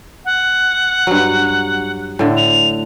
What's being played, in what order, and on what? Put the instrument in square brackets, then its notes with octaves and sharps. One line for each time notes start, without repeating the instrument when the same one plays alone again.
[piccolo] F#5
[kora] G2 F#3
A2 D3
[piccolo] F7